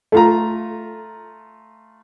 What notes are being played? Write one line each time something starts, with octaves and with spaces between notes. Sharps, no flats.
A3 F4 A#5